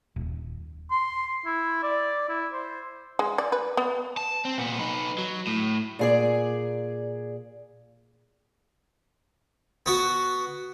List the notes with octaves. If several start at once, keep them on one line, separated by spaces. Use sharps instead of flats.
D#1
C6
E4
D5
E4
C5
G#3
D5
B4
B3
A5
C4
A#2 B3
D#4 B4
F#3
A2
A#2 G#4 D5
B3 F#4